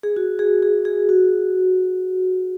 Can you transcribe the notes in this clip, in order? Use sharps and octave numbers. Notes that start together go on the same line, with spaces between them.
G#4
F#4
G#4
G#4
G#4
F#4